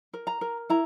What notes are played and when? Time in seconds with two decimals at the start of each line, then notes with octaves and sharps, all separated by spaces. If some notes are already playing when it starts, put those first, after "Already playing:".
0.13 A#4
0.27 A#5
0.41 A#4
0.70 E4 A#5